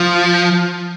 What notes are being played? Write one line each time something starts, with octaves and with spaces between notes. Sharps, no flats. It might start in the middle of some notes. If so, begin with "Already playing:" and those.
Already playing: F3